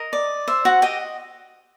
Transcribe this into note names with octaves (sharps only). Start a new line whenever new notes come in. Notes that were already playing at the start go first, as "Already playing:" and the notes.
Already playing: A#4 D#5
D5
C5 E5
F#4 F#5
G4 D#5 G5